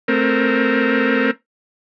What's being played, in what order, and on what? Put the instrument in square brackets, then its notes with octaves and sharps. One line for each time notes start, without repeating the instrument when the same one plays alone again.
[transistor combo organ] A3 C4 A#4